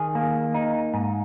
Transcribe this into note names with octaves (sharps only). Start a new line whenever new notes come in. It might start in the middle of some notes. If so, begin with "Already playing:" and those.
Already playing: D#3 G#4
A#3
D#4
G#2